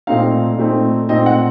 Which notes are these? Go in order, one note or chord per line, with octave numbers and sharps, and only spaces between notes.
A#2 A3 C4 D#4 F5
A#2 A3 C4 D#4
A#2 A3 C4 D#4 D#5
F#5